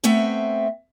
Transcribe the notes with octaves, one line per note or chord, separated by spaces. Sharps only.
A3 B3 C4 E5 G5